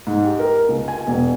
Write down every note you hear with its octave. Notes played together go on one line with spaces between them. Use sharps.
G#2
G4
A#4
C#2
G#5
E1